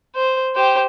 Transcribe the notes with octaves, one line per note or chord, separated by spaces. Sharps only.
C5
G4 C5